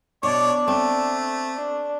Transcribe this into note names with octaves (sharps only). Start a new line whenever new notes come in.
B2 D4 C#5 D5
A3 C4
D4